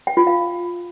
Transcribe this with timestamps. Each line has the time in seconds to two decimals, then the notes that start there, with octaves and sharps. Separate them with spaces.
0.07 G5
0.17 F4
0.27 F5